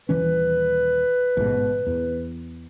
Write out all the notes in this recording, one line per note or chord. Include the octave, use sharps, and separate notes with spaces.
D#1 E3 C#4 B4
A1 G#2 B2
E2